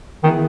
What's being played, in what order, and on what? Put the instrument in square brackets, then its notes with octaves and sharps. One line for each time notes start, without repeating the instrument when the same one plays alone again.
[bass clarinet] D#3 [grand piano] E3 B3 E4 G#4